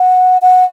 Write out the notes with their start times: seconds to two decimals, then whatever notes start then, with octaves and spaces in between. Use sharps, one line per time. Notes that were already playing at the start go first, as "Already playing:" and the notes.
Already playing: F#5
0.42 F#5